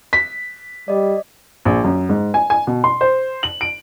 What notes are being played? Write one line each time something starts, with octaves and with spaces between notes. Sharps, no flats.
B6
G3 D5 D#5
A#1
F#2
G#2
G#5
G#5
B2
C6
C5
F#7
D7